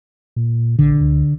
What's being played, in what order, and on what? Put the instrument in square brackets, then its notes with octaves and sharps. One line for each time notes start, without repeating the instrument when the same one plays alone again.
[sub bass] A#2
[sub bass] A#1 [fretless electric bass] D3
[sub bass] D2